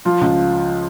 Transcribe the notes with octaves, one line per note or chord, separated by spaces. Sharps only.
F3 F4 F5
C#2